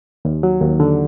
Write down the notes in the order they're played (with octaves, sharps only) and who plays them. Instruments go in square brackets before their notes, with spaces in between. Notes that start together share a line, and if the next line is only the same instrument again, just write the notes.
[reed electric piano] D#2
F#3
D#2
D3